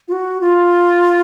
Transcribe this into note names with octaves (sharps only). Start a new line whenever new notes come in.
F4
F#4
F4